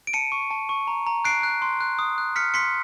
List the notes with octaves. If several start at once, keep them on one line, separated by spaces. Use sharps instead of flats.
D7
A5 C#7 D#7
C#6
A5
C#6
A#5
A#5
F#6 C7 D7
F#6
C6
F#6
D#6
F#6
F6 B6 C#7
C6 B6 C#7